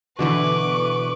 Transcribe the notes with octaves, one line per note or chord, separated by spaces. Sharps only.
B2 D3 E3 B4 C#6 D6